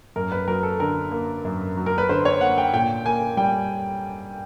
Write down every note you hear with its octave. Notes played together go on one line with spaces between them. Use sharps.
F#2 A#4
B4
F#3 A#4
A4
D3 A#4
A#3
F#2
F#3
A#4
B4
D3 C5
C#5
A#3 F#5
G5
A#2 G5
A#3 G#5
G3 G5